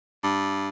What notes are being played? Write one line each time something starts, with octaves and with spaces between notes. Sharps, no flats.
G2